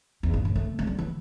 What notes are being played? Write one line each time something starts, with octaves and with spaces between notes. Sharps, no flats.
E2
G2
A2
A3
A3
G3
E3